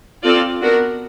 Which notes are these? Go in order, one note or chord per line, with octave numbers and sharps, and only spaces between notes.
C4 F4 A4 D5
B3 D4 F#4 A#4